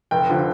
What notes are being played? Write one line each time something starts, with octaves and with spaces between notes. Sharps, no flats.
F1 G5
D3 F3